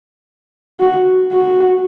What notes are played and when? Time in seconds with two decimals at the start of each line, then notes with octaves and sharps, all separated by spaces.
0.80 F#4
1.33 F#4